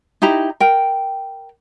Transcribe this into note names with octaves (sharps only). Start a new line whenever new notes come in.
D#4 E4 G4 A#5
A#4 G5